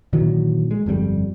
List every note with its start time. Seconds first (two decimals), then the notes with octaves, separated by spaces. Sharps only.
0.13 A#2 D#3 E3 F#3
0.71 G#3
0.86 G1 F2 C#3 G3